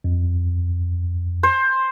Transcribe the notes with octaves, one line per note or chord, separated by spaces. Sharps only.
F2
C5